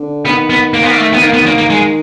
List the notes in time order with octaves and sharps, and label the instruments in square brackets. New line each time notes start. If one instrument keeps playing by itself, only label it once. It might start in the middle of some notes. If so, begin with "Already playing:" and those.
Already playing: [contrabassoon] D3
[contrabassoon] D#3 [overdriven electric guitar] B3
[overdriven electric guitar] B3
A#3
B3
A#3
A3
B3
[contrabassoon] D#3 [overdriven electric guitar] A#3
[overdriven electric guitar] B3
A#3
A#3
G#3